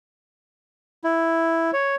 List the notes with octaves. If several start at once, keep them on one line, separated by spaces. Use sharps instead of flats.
E4
C#5